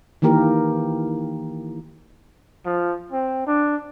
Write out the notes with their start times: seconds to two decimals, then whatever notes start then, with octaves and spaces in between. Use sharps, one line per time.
0.22 D#3 E3 A#3 G4 A#4
2.65 F3
3.12 C4
3.47 D4